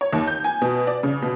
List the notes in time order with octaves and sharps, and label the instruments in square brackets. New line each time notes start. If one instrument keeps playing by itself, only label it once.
[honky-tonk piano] C#5
D#2
G6
G#5
B2
D5
C#3
B2